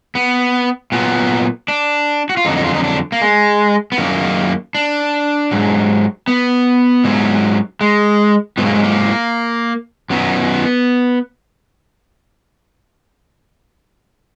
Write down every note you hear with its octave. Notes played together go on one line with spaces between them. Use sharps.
B3
A#2 F#3 B3
D4
F#4
F4
F2 D3 F#3 D#4
D#4
F4
D#4
D4
A#3
G#3
B3
F#2 D#3 F#3 A#3
D4
G#2 F#3
B3
G#2 F#3
G#3
G#2 F#3 B3
A#3
G#3
A#3
F#2 D#3 F#3 B3